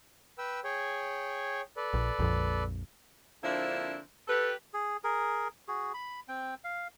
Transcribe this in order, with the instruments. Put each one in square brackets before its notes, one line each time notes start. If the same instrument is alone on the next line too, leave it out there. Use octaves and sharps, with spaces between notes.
[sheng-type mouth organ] B4 G5 E6
G#4 C#5 G5
A4 B4 D5
[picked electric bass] A#1
A#1 F2
[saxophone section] D3 F3 A#3 C4 D4 E4
G4 A4 B4
[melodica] G#4
G#4 A#4
F#4 G#4
B5
C4 G5
F5